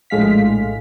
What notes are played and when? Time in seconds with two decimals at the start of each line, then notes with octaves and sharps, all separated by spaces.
0.10 A#1 A2 G#3 F5 B6